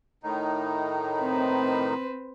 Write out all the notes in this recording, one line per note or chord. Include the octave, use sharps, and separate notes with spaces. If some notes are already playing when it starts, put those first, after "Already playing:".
A2 D#3 D#4
C4 B4 C5